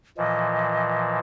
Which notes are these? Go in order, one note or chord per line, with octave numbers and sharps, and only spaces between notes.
A#2 E3 F3 D#5